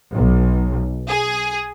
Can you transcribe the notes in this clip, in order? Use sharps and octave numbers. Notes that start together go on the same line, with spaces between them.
B1
G#4